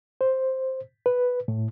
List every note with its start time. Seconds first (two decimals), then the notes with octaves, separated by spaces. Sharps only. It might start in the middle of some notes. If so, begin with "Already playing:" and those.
0.21 C5
1.06 B4
1.48 A2